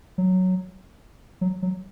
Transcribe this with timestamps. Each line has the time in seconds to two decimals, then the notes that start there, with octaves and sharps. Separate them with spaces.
0.18 F#3
1.41 F#3
1.62 F#3